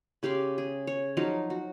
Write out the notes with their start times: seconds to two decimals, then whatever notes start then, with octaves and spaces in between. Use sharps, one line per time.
0.23 C#3 G4 F5 C6
0.58 G#4
0.87 C#5
1.17 F3 F#3 D#4 F5
1.50 F#4